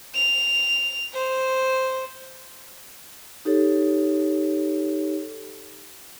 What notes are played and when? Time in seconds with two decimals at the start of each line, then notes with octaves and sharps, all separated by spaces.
0.14 F7
1.13 C5
3.45 D#4 G4 A4 C#5